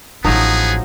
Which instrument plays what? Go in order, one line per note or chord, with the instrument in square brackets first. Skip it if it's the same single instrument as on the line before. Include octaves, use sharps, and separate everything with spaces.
[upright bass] A1 E4 [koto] F3 F#3 D#4 [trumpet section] B3 G#4